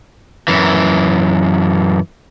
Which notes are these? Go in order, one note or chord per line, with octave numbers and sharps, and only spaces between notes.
F#2 E3